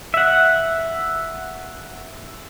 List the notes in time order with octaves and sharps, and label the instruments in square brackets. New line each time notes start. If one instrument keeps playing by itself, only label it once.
[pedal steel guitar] E5 F#5